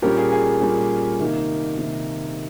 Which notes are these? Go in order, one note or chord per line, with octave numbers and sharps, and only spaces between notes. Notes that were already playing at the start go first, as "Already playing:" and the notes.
A#2 G3 C#4 G4 A#4
G#4
G#4
A#2 G3 C#4
C3 D#3 A#3 D#4
C3 D#3 A#3 D#4